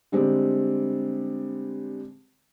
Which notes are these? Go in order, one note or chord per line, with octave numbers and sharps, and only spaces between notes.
D3 G3 G#3 C4